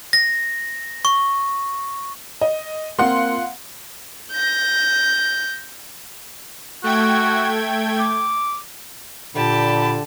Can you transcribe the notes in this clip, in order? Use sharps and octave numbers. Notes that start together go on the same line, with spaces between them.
A#6
C#6
D#5
A#3 C4 F4 F#5 C6
G6 A#6
A3 F#4 G5 G#6
D6
A#2 D3 G4 A5 B5